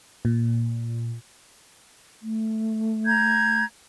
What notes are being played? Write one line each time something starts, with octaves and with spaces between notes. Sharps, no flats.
A#2
A3
A#5 G6 G#6